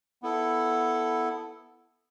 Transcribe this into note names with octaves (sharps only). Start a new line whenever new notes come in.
B3 E4 A4